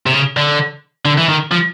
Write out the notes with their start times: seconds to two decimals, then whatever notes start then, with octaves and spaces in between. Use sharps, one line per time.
0.06 C3
0.13 C#3
0.37 D3
1.05 D3
1.18 E3
1.29 D#3
1.51 F3